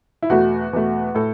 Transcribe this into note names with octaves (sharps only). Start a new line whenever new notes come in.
E4
E2 B2 A3 F#4
E2 B2 A3
A2 A4